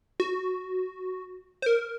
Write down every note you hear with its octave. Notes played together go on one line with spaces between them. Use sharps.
F#4
C5
A#4